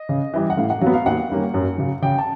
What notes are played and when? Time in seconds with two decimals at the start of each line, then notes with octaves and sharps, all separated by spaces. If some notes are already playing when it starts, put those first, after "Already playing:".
Already playing: D#5
0.09 C#3
0.34 E3 G3
0.50 F#5
0.57 A2 F5
0.70 F#5
0.81 F#3 F5
0.86 B3
0.94 F5
1.06 D#2 F#5
1.31 D#3 G3 A#3 C#4
1.54 F#2
1.78 C#3 F#3
2.02 C#3 G5
2.18 A5